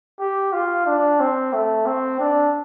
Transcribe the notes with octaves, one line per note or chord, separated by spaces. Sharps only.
G4
F4
D4
C4
A3
C4
D4